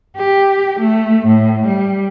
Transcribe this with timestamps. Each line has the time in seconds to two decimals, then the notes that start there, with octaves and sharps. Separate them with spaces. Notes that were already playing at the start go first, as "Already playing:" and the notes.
0.15 G4
0.80 A3
1.26 A2
1.67 G3